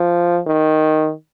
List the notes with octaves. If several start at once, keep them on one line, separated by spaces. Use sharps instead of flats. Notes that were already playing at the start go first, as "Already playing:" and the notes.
Already playing: F3
D#3